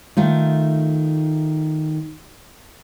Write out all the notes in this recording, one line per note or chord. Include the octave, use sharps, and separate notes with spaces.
D#3 A3 F4